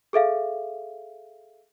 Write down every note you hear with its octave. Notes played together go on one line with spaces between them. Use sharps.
G#4 A4 E5 F5